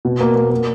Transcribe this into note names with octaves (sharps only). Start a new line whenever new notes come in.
B2
A#3
A#3
A#3